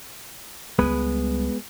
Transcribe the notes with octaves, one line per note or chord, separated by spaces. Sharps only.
C#2 G3 G#3 B3 B4